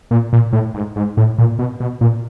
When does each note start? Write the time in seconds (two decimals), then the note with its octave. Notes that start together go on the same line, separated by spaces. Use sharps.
0.11 A#2
0.33 A#2
0.53 A2
0.74 G#2
0.96 G#2
1.17 A2
1.38 A#2
1.59 B2
1.80 B2
2.01 A#2